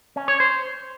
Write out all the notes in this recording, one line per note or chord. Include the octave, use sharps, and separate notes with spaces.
C#4
C#5
C5